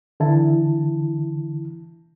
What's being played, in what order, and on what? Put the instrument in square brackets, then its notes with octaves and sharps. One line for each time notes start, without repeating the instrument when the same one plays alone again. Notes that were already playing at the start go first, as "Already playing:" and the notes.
[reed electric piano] D3 E3 E4 A5